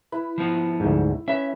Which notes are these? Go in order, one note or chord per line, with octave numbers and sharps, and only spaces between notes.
E4 B4
F3 B3
D2 G#2
C#4 B4 E5